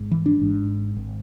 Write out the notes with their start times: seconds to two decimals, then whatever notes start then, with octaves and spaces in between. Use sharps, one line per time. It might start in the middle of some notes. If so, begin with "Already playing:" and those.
Already playing: G#1 G#2
0.11 E3
0.26 D4
0.40 G#1 G#2
0.97 G#1